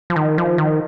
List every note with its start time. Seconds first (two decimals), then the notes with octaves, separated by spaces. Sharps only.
0.10 F3
0.16 D#3
0.38 F3
0.58 D#3